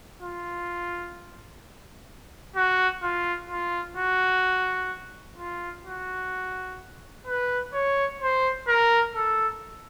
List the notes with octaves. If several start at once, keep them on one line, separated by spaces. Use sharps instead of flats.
F4
F#4
F4
F4
F#4
F4
F#4
B4
C#5
C5
A#4
A4